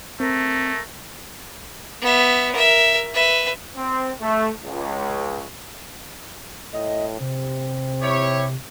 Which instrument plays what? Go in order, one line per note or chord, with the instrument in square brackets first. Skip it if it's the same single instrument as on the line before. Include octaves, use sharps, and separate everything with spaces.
[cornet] A3 [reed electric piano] C4 [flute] A#4
[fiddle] B3 E5
A#4 E5
B4 E5
[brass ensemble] C4
A3
C#2
[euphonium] A2 [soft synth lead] D#5
[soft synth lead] C3 [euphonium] C4
[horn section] E4 G4 C#5